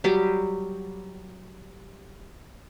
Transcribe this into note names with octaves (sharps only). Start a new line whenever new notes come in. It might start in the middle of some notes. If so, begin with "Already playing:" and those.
F#3 G3 G4